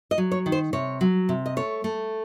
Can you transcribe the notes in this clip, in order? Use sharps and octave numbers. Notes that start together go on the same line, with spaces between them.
D#5
F#3
C#5
D#3
C5
C3 C#5
F#3
C3
D#5
A3 C#5
A3